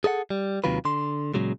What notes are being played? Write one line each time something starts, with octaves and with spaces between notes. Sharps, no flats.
G#4 A4 D#5 F#5
G3
D#2 C3 D#3 F#3 F4 B4
D3 C6
A#2 C#3 F#3 G#3